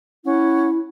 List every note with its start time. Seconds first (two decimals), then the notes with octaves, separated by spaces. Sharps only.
0.25 C#4 E4 F#5